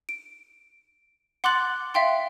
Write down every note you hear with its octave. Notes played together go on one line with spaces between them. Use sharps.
D7
F#5 C6 D6 F#6 A6 F#7
E5 F5 G5 C6